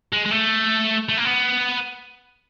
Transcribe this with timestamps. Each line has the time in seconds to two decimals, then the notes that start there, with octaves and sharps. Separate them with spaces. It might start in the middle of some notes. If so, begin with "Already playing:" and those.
0.13 G#3
0.26 G#3
0.31 A3
1.09 A3
1.17 A#3
1.25 B3